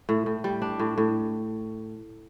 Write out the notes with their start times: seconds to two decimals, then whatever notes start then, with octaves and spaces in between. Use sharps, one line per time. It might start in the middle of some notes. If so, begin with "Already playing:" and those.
0.09 A2
0.26 A2
0.44 G3
0.62 D4
0.79 A2
0.98 A2